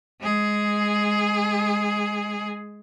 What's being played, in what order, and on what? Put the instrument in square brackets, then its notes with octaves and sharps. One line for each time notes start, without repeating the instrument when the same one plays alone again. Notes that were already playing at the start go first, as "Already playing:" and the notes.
[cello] G#3 G#4